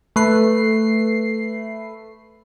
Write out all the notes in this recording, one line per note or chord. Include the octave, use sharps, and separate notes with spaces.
A3 B4 C7